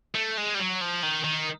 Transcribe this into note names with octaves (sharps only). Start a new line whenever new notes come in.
A3
G#3
G3
F#3
F3
D#3
D#3